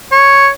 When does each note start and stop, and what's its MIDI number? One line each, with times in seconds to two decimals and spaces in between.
0.12 0.49 73